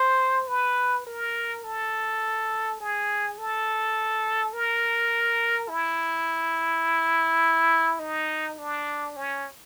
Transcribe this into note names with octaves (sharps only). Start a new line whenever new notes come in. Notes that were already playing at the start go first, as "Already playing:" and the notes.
Already playing: C5
B4
A#4
A4
G#4
A4
A#4
E4
D#4
D4
C#4